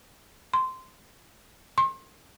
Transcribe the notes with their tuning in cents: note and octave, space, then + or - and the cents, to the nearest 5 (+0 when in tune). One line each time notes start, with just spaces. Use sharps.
C6 -15
C6 +35